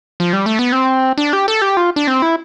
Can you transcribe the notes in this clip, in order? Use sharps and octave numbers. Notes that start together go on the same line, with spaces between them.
F3
G3
A3
B3
C4
D4
G4
A4
G4
F4
D4
C4
E4